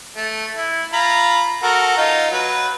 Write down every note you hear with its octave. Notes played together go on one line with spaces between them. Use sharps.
A3
E4
F4 A#5 B5
F#4 A4 A#4
D#4 F4
F#3 B4